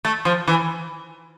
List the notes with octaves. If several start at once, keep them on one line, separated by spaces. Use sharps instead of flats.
A3
F3
E3